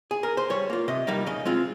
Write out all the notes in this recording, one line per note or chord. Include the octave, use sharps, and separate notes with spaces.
G#4
A#4
C5
G3 C#5
A#3 F4
C3 D#5
G3 A#3 D#4
C#3 D#5
G#3 C4 F4